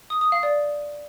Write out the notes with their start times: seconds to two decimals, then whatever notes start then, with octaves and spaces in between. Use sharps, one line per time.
0.10 D#6
0.21 D#6
0.32 F5
0.43 D5